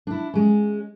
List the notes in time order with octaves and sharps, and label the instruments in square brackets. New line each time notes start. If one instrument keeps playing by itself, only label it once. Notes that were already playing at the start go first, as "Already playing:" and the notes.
[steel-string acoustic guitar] D4 E4
G#3 C#4